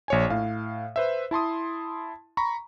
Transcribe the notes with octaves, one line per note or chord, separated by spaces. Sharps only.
A#1 C#5 G#5
A2 F5
B4 C5 E5
E4 A5 C6 D#6
A#5 B5 C#6